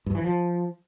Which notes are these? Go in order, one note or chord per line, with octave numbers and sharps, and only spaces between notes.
G2
E3
F3